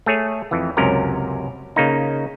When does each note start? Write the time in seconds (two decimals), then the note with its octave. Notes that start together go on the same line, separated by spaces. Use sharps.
0.06 A3 G#4 C#5
0.51 F2 E3
0.77 C#2 F#2 C3 C#4 A#4
1.76 C#3 A#3 D#4